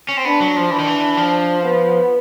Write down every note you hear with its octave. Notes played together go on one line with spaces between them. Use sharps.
C#4
C4
B3 D4
F#3
F3
E3 D4
D#3
E3
F3
B3